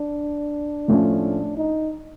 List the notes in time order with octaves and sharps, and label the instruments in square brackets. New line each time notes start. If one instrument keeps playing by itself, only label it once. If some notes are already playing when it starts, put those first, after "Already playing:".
Already playing: [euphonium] D4
[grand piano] A2 F3 A3 C#4
[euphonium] D#4